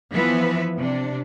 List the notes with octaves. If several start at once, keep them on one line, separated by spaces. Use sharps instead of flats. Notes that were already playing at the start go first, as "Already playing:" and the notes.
E3 F3 B3 B4 E5
C3 D4